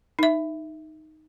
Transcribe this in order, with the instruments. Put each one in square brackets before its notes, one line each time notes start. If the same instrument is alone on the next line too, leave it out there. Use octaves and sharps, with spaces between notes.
[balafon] D#4 E5